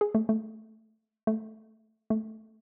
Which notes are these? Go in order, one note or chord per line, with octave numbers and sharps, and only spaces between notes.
G#4
A3
A3
A3
A3